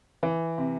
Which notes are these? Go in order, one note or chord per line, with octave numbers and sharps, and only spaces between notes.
E3
C3